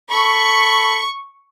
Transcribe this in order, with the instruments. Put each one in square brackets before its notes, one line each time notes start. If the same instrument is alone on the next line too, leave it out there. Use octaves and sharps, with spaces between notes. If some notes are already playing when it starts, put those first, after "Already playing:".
[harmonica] A4 B5 [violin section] C#6